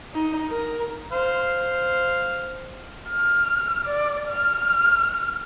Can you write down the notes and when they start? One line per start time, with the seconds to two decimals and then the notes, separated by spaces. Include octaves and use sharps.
0.14 D#4
0.49 A#4
1.12 C5 F5
3.09 F6
3.85 D5
4.29 F6